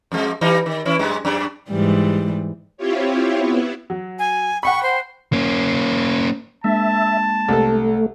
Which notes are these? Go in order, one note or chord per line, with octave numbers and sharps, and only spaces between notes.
F2 F3 G#3
E3 G3 D#4
D#3
E3 C#4 E4
F#2 G#3
F#2 D4
G#2 E3 G3
C4 E4 F4 G4 C#5
B3 E4
F#3
G#5
F#5 G5 B5 C#6
C5
A#3 C#4
G#3 A#3 D4 E5 A5
C2 A3 A4